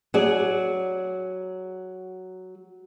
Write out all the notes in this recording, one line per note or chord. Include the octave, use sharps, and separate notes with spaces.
F#3 G#4 D5